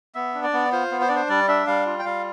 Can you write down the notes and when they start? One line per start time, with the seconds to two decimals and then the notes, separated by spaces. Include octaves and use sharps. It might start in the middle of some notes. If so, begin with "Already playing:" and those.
0.15 B3 E5
0.34 D4
0.44 D5
0.53 B3
0.72 F4 C5
0.91 B3
1.01 C5
1.08 D4 D5
1.16 C5
1.29 G3 D5
1.48 D4 E5
1.67 G3 F5
1.86 F4
1.99 G5
2.05 G3 F5